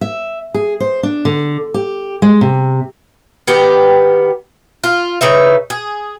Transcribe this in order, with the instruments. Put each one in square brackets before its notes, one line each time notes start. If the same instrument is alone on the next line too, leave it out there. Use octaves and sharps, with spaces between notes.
[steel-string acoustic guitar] E5
G#4
C5
D4
D3
G4
G#3
C3
[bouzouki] D#3 B3 G4
F4
C#3 D#4 B4 E5
G#4